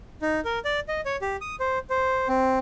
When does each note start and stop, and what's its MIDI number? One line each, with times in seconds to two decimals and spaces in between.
0.22 0.40 63
0.45 0.59 70
0.65 0.80 74
0.88 1.01 75
1.05 1.17 73
1.22 1.37 67
1.41 1.56 87
1.60 1.79 72
1.90 2.28 72
2.28 2.59 60